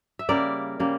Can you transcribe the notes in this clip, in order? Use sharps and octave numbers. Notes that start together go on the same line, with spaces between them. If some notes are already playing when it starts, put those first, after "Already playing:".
E5
C#3 G3 A#3 A#4 D5
C#3 G3 A#3